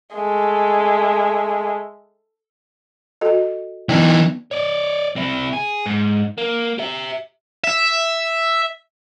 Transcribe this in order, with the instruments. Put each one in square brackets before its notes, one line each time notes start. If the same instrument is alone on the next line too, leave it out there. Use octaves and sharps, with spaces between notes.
[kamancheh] G#3 A3
[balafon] F#4 A4 D#5
[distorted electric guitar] E3 D#4 [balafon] B3 D5 G5
[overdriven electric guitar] C#5 D5
C3 E4
G#4
G#2
A#3
G4 E5
[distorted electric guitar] E5